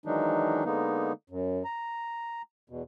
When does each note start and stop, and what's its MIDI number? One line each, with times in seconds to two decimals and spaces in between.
0.06 0.65 51
0.06 0.65 52
0.06 0.65 54
0.06 0.65 56
0.06 0.65 62
0.06 0.65 63
0.65 1.13 50
0.65 1.13 56
0.65 1.13 58
0.65 1.13 59
0.65 1.13 63
1.30 1.63 42
1.65 2.42 82
2.70 2.83 40
2.70 2.83 47